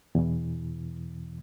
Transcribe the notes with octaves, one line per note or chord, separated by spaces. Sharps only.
E2 B2 E3